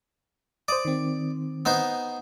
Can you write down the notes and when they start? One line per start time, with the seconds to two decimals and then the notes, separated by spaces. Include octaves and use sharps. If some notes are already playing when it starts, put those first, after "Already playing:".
0.68 C5 D5 D#6
0.85 D#3 C4
1.65 B3 D#4 C5